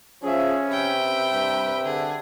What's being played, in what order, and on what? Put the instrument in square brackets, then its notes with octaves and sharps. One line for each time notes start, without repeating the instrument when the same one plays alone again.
[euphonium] F3 [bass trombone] C#4 [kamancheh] G#4 E5
[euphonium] C3 [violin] B4 G5 [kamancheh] E5
[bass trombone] G2
[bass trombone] D3 [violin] G#4